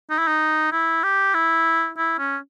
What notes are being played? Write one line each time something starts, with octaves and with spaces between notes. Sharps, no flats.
D#4
E4
D#4
E4
G4
E4
E4
C#4